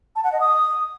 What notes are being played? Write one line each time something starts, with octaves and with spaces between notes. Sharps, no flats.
A5
F#5
D#5
D#6